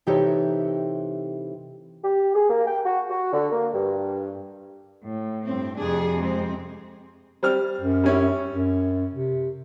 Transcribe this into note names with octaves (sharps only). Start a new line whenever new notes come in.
C3 E3 D#4 G4 A4 C#5
G4
G#4
A#3
G5
F#4
F#4
D3
A#3
G2
A2
G2 C4
F2 C3 D4 G#4
G#3 C4
G3 C4 F6
F#2
G3 C#4 E4
F#2
C3